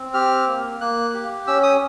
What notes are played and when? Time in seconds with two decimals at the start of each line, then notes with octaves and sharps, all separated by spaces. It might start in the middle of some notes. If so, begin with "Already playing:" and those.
Already playing: C4
0.14 G4 F6
0.47 A#3
0.80 A#3 F#6
1.14 G4
1.47 C#4 E6
1.63 D#6